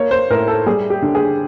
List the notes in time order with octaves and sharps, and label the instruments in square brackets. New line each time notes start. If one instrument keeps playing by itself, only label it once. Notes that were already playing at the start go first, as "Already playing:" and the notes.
Already playing: [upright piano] A#3 C#5
C5
A2 A#4
A4
G3 G#4
G4
D3
G#4